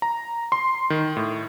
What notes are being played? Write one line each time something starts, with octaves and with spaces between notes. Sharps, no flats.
A#5
C6
D#3
A2